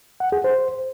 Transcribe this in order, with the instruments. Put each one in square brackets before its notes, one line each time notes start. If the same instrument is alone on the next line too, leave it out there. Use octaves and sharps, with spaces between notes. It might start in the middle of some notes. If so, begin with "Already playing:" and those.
[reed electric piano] F#5
G#4
C5